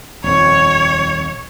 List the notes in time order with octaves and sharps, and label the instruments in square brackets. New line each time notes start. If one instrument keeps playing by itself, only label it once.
[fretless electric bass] D#1 F2 [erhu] C#5